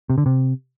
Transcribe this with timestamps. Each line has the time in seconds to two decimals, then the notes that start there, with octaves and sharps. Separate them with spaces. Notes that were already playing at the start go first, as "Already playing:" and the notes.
0.10 C3
0.18 D3
0.26 C3